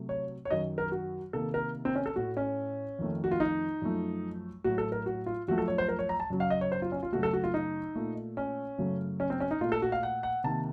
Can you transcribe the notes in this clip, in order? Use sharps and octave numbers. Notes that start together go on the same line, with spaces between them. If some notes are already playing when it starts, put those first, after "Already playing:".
Already playing: C3 F#3 A3
C#5
C#5
F#2 D#3 F#3 D#5
A#4
F#4
C3 D#3 A#3 A4
A#4
C4
C#4
A4
A2 A3 F#4
C#4
F2 D#3 A3
F#4
F4
D#4
F#2 F3 A3
A2 F#3 A3 F#4
A4
A#4
F#4
F4
F#2 F3 A3 F#4
A4
C#5
C5
A#4
C#5
A#5
A5
F#2 C#3 F#3
F5
D#5
C#5
C5
F4
C#4
F4
F#2 C#3 A3 F#4
A4
F#4
F4
D#4
A#2 A3
C#4
F#2 C#3 F#3 A3
C#4
C4
C#4
D#4
A#2 A3 F4
A4
F#4
F5
F#5
F#5
C3 D#3 A#3 A5